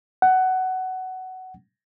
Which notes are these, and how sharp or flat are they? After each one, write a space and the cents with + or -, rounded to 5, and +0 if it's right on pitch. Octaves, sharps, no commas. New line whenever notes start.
F#5 +15